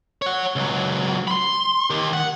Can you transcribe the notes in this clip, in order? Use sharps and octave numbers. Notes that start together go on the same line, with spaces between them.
C#5 F#5
C#2 F#3
B5 C6
D#3 G4
F#5